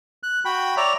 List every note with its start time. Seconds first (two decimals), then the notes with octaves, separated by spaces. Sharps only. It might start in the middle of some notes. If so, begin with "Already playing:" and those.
0.23 F#6
0.45 F#4 G5 B5
0.77 C#5 D5 E5 A#5